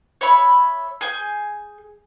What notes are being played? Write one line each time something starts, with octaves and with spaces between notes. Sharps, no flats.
C#5 E5 B5
G#4 G#5 G6